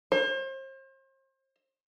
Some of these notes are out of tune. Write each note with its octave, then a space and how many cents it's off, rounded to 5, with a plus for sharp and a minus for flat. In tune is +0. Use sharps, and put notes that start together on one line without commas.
C5 +40